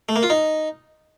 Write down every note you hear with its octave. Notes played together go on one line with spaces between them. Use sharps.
A3
A#3
F4
D#4